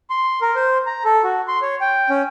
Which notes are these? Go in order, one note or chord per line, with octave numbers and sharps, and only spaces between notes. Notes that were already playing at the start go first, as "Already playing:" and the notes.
C6
A#4
C5
A#5
A4
F#4
C6
C#5
G5
C#4